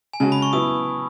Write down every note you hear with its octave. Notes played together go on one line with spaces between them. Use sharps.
G#5
C#3 G#3 C#4 F#4 A5
B5
C#6
F#3 B3 E4 D#6